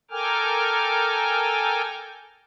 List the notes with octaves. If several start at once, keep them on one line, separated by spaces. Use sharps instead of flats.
A4 A#4 G5 G#5 D6 F6